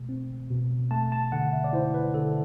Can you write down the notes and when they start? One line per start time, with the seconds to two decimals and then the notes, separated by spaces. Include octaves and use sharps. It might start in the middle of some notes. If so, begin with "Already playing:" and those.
Already playing: B2 A3
0.09 C4
0.50 B2
0.91 A3 A5
1.12 A5
1.32 D3 F#5
1.53 E5
1.64 D5
1.73 E4 C5
1.94 B4
2.14 D3 A4